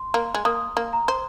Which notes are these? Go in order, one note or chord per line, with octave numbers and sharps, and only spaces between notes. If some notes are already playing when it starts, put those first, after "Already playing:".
Already playing: C6
A#3
G#3
A#3 D#6
A#3
A#5
C5